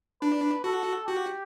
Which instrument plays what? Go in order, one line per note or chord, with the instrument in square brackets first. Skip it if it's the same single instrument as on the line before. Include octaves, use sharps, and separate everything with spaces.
[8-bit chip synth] D4 [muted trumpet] B4
[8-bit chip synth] F#4 [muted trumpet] A4
[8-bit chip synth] F#4 [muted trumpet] G4